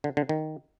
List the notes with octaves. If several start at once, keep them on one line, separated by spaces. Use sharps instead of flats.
D3
D3
D#3